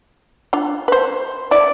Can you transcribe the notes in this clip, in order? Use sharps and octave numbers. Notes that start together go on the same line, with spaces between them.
D4 F4
B4 C5
E4 D5